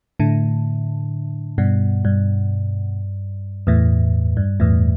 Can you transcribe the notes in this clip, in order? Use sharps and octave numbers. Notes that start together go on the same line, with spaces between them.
A2 D3
G2 B2
G2
E2 A2
G2
E2 A2